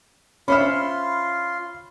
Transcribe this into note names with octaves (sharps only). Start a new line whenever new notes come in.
C#4 F4 C5 E5 B5 C6 F6